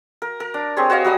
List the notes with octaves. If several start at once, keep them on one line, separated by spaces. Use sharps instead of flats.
A#4
A#4
D4
C4 G4 G#4 C#5
F#4 C#5 D#5 F5
F#3 G3 D#5 D#6